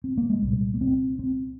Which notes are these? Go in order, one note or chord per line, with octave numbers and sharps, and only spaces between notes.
C4
A#3
G#3
C2 A#2 G3
A#3
C4
C4